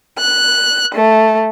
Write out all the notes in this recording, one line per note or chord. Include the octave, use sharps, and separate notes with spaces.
F#6
A3